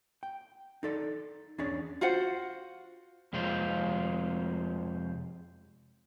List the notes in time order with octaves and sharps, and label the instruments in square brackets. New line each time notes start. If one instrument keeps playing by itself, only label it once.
[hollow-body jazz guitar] G5
D#4 A4 D5
E2 C#4 D4 G#4 C#5 D5
[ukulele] F4 F#4 C5 F#5
[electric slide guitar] F2 C3 G#3 C4 F4